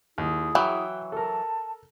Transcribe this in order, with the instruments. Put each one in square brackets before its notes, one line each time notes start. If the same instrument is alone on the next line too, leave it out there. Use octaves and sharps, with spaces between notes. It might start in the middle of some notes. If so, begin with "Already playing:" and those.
[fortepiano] D#2 [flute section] E4 G#4 D#6
[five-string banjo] E3 F#3 [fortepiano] E5 G5
[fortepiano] A4 A#4 [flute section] A5